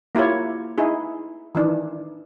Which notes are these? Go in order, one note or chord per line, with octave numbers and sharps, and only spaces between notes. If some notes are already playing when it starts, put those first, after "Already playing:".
A#3 E4 F4 G4 C#5
D#4 E4 G#4
D#3 E3 D4